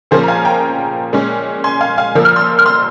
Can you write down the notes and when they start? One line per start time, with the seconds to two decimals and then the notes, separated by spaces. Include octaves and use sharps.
0.11 A#2 F3 A#3 C#4 G#4 C5
0.23 A#5
0.28 F5 G#5
0.45 G5 A#5
1.13 A#2 G#3 C#4
1.64 G#5 C6
1.81 F5 G#5
1.98 F5 G#5
2.15 A#2 F3 A#3 E6
2.25 F6
2.36 C6 E6
2.59 F6
2.66 C6 E6